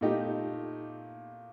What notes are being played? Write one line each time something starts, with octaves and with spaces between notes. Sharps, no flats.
A#2 A3 D#4 G4